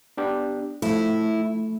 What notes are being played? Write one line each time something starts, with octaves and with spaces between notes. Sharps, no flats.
B3 D4 G4
F3 A3 E4